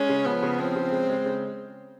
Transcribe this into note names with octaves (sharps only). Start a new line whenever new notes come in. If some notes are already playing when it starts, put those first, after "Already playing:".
Already playing: G#3 C#4
C#3
F3 B3
C#3
F3 C4
C#3
G#3
G#3
C#3